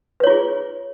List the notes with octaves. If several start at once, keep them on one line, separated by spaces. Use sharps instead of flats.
F4 G#4 B4 C#5